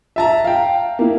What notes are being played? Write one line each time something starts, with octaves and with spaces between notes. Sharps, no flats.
E5 A5 A#5
F5 G5
A#3 E4